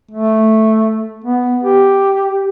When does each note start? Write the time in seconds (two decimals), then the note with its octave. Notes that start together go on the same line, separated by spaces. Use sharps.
0.11 A3
1.24 B3
1.63 G4